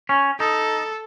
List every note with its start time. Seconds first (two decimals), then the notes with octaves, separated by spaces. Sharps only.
0.09 C#4
0.39 D#4 A4